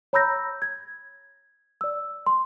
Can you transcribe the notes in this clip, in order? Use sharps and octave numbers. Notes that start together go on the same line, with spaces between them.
C#5 A#5 B5 E6 G6 A#6
G#6
D5 E6
C6